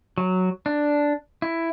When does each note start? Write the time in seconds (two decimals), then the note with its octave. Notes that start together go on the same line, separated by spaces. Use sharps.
0.18 F#3
0.66 D4
1.42 E4